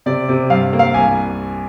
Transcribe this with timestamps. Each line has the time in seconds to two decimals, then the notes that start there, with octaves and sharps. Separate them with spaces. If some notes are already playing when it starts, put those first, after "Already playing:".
0.06 C3 D5
0.29 C3
0.50 G2 F5
0.73 A#3
0.79 F5
0.94 C2 G#5